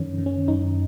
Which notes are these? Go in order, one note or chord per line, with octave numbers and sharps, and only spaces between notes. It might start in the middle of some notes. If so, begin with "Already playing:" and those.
Already playing: F#2 D#3 C#4
D#3
C#4
F#2 D#4